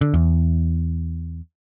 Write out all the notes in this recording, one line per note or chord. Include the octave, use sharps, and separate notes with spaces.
D3
E2